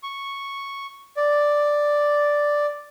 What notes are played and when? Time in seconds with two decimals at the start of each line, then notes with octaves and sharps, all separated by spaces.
0.03 C#6
1.17 D5